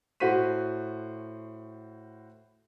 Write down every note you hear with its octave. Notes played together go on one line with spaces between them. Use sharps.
A2 F#4 C5 B6 D#7